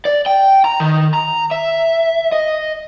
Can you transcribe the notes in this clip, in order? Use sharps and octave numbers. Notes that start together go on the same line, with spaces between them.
D5
G5
A#5
D#3
A#5
E5
D#5